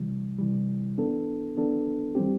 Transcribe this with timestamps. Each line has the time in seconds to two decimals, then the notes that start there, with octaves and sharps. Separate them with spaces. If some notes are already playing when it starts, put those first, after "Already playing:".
Already playing: C3 E3 G3
0.39 C3 E3 G3
0.97 E3 B3 D4 A4
1.56 E3 B3 D4 A4
2.15 E3 G3 C4 G4